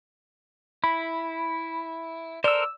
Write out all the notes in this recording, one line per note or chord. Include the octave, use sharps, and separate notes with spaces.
E4 B5
A4 A#4 C5 D5 E6